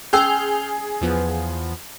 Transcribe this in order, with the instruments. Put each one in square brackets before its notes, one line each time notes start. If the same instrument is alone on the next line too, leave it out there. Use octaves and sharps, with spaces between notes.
[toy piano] C#4 E6 [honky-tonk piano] G#4 [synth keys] C6 F6 G6
[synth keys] E2 F3 B3